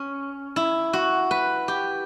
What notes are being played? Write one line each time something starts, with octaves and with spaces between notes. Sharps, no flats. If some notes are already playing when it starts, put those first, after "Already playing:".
Already playing: C#4
E4
F#4
B4
G4